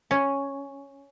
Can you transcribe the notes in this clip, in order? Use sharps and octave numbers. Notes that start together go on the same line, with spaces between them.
C#4